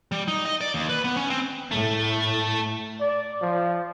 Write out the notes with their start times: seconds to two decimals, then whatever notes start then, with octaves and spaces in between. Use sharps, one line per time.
0.12 G3
0.28 D#4
0.45 D#5
0.61 D5
0.74 D#2
0.89 B4
1.04 B3
1.17 C#4
1.30 C4
1.71 A2 A3
3.01 D5
3.41 F3